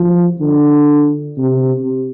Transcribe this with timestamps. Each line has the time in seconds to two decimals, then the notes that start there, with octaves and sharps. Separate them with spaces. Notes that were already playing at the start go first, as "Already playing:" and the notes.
Already playing: F3
0.40 D3
1.38 C3